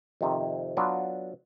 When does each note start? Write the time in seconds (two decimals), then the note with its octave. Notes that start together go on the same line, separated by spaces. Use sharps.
0.21 F2 C3 D#3
0.77 F#3 B3 D4 F4